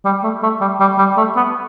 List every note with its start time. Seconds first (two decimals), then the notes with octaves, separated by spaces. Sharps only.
0.05 G3
0.23 A3
0.42 A3
0.61 G3
0.80 G3
0.98 G3
1.17 A3
1.36 B3